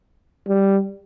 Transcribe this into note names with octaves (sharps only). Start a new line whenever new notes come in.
G3